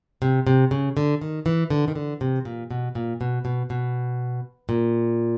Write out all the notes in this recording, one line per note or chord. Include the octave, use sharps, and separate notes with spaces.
C3
C3
C#3
D3
D#3
E3
D3
D#3
D3
C3
A#2
B2
A#2
B2
B2
B2
A#2